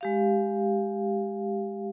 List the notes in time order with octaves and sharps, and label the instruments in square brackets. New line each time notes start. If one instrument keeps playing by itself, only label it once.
[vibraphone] G#3 G4 F5